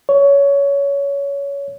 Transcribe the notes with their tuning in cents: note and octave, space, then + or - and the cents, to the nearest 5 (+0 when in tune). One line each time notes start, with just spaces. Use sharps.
C#5 +20